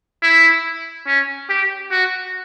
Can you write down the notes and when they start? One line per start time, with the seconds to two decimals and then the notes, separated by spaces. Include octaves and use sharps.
0.22 E4
1.07 C#4
1.49 G4
1.91 F#4